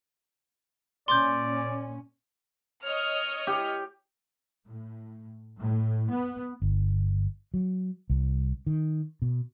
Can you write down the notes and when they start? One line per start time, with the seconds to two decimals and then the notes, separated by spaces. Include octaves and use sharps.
1.08 A#2 C#4 D5 C6 D6 G6
2.84 C#5 D#5 F6
3.47 G4
4.67 A2
5.60 A2
6.12 B3
6.62 G1
7.54 F#3
8.10 C2
8.67 D#3
9.22 B2